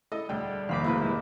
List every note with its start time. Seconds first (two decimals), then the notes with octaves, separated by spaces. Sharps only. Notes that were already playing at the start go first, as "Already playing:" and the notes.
0.12 E4 A4 D#5
0.29 E1 D2 G3 G5
0.69 F1 A#2 D#3 F5 B5 D6
0.84 D2 G#2 A#3 E4 B4
1.01 G2 F3 E4